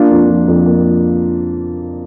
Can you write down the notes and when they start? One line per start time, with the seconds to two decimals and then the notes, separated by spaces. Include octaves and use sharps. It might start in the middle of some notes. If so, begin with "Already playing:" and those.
Already playing: A#3 D4 F4
0.11 F2
0.30 F3
0.48 F2
0.66 A#3